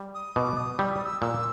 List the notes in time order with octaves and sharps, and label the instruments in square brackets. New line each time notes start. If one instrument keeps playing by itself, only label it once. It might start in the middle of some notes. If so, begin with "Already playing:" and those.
Already playing: [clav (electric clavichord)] G3
[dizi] D#6
[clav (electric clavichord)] B2 [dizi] D6
[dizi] D#6
[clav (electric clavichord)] G3 [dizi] E6
[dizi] D#6
E6
[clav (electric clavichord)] A#2 [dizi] E6